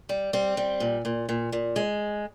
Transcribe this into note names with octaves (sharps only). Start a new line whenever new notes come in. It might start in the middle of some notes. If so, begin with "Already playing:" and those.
G3
G3 C4
G3
A#2
A#2
A#2
A#2
G#3